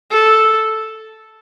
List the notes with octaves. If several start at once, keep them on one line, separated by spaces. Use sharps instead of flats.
A4